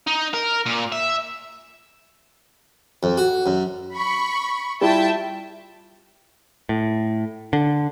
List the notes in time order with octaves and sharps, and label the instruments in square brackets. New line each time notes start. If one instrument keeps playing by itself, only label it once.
[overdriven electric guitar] D#4
A#4
A#2
E5
[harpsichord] F2
F#4
F#2
[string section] B5 C#6
[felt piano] G3 E4 F4 [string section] E5 G5 A5
[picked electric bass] A2
D3